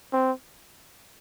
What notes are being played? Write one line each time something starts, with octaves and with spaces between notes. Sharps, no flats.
C4